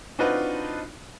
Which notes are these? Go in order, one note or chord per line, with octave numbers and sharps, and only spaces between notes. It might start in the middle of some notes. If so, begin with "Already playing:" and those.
C4 D4 D#4 F4 F#4 B4